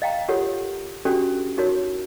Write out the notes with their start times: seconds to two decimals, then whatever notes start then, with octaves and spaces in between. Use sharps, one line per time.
0.02 D#5 F5 G5 A#5
0.28 F4 G4 A4 A#4 C#5 F#5
1.05 C#4 D4 F#4 G4 A4
1.57 D#4 E4 F#4 A#4 C#5